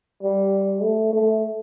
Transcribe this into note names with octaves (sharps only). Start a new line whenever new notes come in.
G3
A3
A3